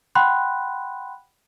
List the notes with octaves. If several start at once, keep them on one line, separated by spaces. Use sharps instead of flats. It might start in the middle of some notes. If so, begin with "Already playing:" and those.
F#5 G5 B5 C6 F#6